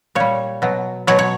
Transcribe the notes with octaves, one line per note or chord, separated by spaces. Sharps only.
A#2 G3 C#5
B2 F#3
B2 F#3 C#5
C#5